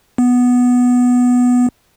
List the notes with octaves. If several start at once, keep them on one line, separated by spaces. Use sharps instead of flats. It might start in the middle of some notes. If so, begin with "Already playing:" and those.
B3